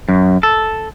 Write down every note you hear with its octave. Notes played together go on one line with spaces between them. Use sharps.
F#2
A4